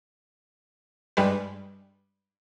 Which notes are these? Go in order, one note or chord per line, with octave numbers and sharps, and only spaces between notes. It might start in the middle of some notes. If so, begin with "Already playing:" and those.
G2 G3 G#3 B4